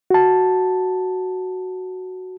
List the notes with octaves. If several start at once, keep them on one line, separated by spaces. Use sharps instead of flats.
F#4 A5